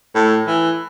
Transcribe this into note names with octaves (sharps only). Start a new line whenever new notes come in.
A2
E3